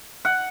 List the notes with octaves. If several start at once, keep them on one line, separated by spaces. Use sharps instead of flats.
F#5